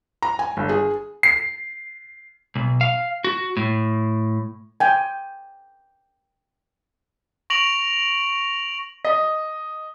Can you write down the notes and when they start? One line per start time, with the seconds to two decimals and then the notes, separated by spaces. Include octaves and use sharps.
0.22 A#5
0.39 G#5
0.57 G1
0.69 G#4
1.23 C7
2.55 B1
2.81 F5
3.24 F#4
3.57 A2
4.80 G5 G#5
7.50 C#6 A#6 D7 F7 F#7
9.05 D#5